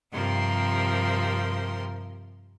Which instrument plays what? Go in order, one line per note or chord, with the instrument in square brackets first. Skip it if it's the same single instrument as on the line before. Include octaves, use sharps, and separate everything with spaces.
[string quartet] G2 C3 F3 A#4 C6